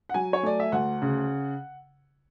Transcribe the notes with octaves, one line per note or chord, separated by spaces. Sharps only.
F#5
F#3 G#5
C#5
A3 D5
E5
D2 F#5
C#3